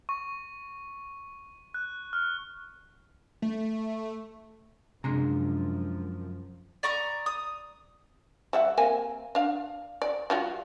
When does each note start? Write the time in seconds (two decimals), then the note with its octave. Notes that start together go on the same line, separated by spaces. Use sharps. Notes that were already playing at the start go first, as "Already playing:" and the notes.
0.09 C#6
1.74 F#6
2.13 F6
3.42 A3
5.04 F#2 C3 F3 G#3 D4 A#5
6.83 D5 A#5 C#6 D#6
7.26 D#6
8.53 G3 E5 F#5
8.78 A#3 C4 G#5
9.35 D4 F5
10.02 D5
10.30 G3 F4 F#4